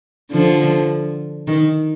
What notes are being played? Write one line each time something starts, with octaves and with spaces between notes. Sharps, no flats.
D3 F3
D#3